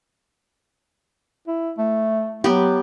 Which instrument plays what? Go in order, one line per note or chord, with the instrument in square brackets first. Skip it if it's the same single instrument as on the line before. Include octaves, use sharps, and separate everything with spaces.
[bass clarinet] E4
A3
[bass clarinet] F#3 [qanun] B3 G4